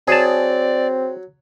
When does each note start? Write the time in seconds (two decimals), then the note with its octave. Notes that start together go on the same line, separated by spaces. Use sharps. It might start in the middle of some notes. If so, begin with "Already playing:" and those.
0.08 F#3 C4 G#4 D5 A5